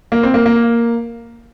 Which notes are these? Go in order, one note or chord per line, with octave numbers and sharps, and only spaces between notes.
A#3
C4
A#3
A#3